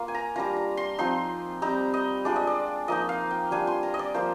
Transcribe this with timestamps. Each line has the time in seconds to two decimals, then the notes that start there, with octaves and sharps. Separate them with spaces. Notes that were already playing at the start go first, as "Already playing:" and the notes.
Already playing: A#3 F4
0.08 G#5
0.14 A#5
0.36 G3 D4 F4 A#5
0.57 A#5
0.77 C6
0.98 F3 C4 D#4 C6
1.62 G3 C4 D#4 A#5
1.94 D#5
2.25 G#3 D4 F4 D5
2.36 D#5
2.47 D5
2.88 F3 A#3 D#4 D#5
3.09 F5
3.31 G5
3.51 G3 D4 F4 G#5
3.67 C6
3.83 A#5
3.94 D#5
3.99 D5
4.14 F3 A#3 F4 C5